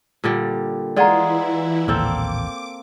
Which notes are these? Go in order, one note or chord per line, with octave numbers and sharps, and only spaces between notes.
A#2 D3 G3
E3 G#3 E4 F4 G#4 D5 F#5 A#5
A1 D#2 A#2 A#3 C4 A4 D6